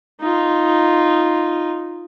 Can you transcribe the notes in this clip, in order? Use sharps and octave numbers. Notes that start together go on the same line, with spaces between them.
D#4 F4